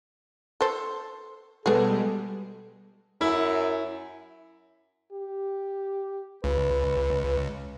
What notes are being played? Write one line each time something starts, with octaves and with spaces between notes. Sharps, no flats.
A4 C5
B2 G3 G#3 B3 G#4 A4
F#2 E4
G4
C#2 B4